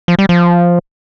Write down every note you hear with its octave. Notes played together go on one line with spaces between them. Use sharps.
F3
G3
F3